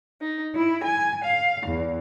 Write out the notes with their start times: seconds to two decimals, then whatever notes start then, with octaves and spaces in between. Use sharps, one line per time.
0.20 D#4
0.54 E4
0.84 G#5
1.24 F5
1.66 E2